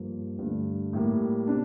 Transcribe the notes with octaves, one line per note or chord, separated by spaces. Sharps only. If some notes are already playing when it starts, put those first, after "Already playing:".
Already playing: G2 F3 A#3
G2 D3 A3
A2 G3 A#3
C3 D4